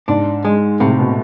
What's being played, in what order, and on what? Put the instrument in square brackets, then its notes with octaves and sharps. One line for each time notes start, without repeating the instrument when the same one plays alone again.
[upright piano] G#2 [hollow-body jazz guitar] D4
[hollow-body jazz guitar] G#3
[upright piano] A2 [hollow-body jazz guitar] C3
[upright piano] B2